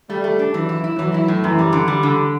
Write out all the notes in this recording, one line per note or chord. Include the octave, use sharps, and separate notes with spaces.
G3 A3
A3
D4
E3 F#3
E4
E4
E3 F#3
E4
A2
F#2 E3
G3
D3
G3
D3